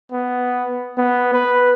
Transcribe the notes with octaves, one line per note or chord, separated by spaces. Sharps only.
B3
B3
B4